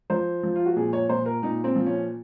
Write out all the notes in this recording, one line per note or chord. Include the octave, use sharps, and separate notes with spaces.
F3 C5
F3
F4
F#4
A#2 G#4
C#5
A#2 C5
A#4
A#2 D#4
C4
F3
C#4